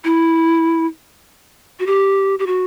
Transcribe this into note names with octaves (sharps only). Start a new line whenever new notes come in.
E4
F#4
G4
G4
F#4